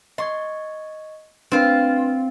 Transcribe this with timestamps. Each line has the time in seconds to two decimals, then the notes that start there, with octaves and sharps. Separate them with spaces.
0.18 D#5 C6 C#6 G#6
1.52 A3 C4 D4 F4 B4